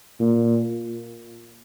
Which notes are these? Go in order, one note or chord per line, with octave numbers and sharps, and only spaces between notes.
A#2